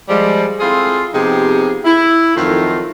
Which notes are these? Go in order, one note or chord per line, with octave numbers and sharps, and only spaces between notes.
F3 G3 G#3
C4 E4 F4 G#4 A4
C3 F3 B3 D#4 G4 G#4
E4
F2 D#3 F#3 A3 D#4 F4